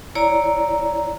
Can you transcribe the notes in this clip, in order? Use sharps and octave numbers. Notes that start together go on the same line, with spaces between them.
E4 C#5 D5 A#5